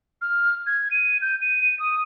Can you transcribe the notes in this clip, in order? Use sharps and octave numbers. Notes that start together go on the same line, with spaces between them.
F6
G#6
D#7
G6
D#7
D#6